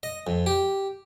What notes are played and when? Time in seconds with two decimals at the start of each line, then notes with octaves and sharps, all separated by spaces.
0.03 D#5
0.27 F2
0.46 G4